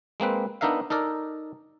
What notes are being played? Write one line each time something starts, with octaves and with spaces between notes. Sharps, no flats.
G#3 A#3 C4 B4
B3 D4 D#4 A#4 E5 F5
D#4 A4 A#4 D5